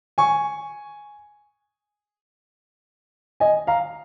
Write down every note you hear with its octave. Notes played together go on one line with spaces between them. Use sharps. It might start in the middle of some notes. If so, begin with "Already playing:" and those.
G#5 C#6
D#5 G#5
F5 A#5